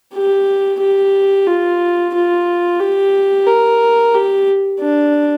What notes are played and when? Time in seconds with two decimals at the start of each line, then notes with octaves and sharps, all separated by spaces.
0.14 G4
0.80 G4
1.47 F4
2.14 F4
2.80 G4
3.46 A#4
4.14 G4
4.80 D4